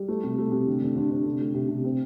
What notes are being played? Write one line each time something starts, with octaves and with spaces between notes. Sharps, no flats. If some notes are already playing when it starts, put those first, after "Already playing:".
Already playing: G3
A3
C3
A3
C3
D3
D3
D3
D3
C3
A3
C3
C3
C4